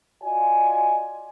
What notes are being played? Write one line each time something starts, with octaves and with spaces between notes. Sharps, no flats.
F4 F#4 D5 D#5 G#5